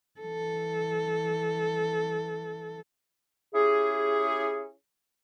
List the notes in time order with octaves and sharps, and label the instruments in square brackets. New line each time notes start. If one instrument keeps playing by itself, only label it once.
[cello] E3 A4
[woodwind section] C#4 E4 G4 G#4